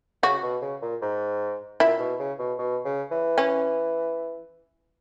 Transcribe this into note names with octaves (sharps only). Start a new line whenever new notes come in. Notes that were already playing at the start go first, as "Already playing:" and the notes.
C#3 F#4
B2
C#3
A#2
G#2
A#2 E4
B2
C#3
B2
B2
C#3
E3
C#4